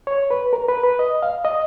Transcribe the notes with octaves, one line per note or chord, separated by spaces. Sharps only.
C#5
B4
A#4
B4
B4
D#5
F5
D#5